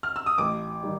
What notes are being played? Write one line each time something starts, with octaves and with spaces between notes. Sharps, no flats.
F6
E6
D#6
A1 D6
D#3 G3